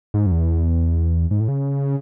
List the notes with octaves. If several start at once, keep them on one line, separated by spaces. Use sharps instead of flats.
G#2
F#2
E2
G#2
A2
C#3